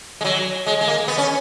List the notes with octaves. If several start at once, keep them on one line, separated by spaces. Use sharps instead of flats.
G#3
F#3
G#3
G#3
A#3
B3
C#4